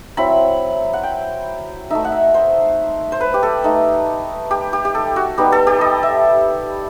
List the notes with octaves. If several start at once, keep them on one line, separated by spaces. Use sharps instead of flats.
F#3 C4 E4 B5
F#5
G5
A3 D#4 E5
F#5
E5
C5
C5
B4
G4
A4
A3 D#4
G4
G4
G4
A4
F#4
G3 B3 D#4 G4
A4
G4
D#5
E5